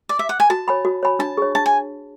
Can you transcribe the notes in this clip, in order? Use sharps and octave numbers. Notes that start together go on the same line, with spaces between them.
D5
E5
F#5
G#5
F#4 A5
C#5 G#5 B5
F#4
C#5 G#5 B5
D4 A5
G#4 C#5
D4 A5
G#5